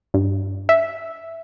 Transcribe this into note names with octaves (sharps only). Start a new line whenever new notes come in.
G2
E5